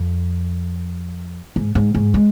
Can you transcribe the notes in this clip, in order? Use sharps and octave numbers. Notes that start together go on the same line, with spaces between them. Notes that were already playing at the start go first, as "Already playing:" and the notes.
Already playing: F2
G#2
G#2
G#2
G#3